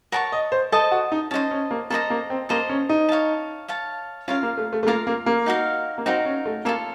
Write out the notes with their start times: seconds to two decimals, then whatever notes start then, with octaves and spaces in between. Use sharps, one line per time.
0.12 A#4 C#5 F#5 A5 C#6
0.32 D#5
0.52 C5
0.72 A4 C5 D#5 A5
0.91 F#4
1.12 D#4
1.31 C#4 A5
1.34 C5 D#5
1.51 C#4
1.71 A#3
1.90 A#3 A4 C5 D#5 A#5
2.10 A#3
2.30 C4
2.49 A#3 A4 C5 D#5 A#5
2.69 C#4
2.89 D#4
3.09 C#5 F5 A5
3.68 C#5 F5 A5
4.28 C#4 F4 A#4 F5
4.43 A#3
4.57 A3
4.73 A3
4.83 A3
4.87 A#3 F4 A#4 F5
5.07 A#3
5.26 A#3
5.46 D#4 F#4 A#4 F5
5.98 A#3
6.06 C4 D#4 F#4 A#4 F5
6.25 C#4
6.45 A3
6.65 A#3 F4 A4 C#5